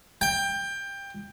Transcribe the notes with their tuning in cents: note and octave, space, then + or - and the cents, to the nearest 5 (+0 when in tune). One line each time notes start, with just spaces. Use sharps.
G5 +20